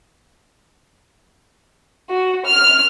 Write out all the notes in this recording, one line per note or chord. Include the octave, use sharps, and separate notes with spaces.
F#4
F6